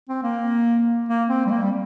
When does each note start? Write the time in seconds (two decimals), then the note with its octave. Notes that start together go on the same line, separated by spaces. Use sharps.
0.09 C4
0.23 A#3
1.09 A#3
1.30 C4
1.46 G3
1.51 A#3
1.62 G3